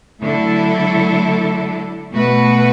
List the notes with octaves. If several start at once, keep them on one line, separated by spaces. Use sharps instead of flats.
D3 F#3 A3 E4 A4
B2 A3 F#4 B4